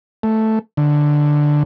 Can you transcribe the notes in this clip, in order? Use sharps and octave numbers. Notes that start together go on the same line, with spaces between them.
A3
D3